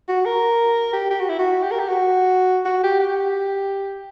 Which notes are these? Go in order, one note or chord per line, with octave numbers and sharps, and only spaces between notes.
F#4
A#4
G4
G4
F#4
E4
F#4
G4
A#4
G4
F#4
F#4
G4
G4